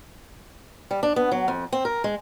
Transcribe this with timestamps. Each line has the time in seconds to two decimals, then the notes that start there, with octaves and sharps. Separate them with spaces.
0.91 G3
1.03 D4
1.16 B3
1.31 F#3
1.48 F2
1.72 C4
1.85 A#4
2.04 G#3